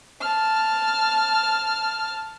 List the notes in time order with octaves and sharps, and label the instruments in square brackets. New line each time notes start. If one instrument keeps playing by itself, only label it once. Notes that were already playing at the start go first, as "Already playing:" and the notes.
[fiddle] A5 F6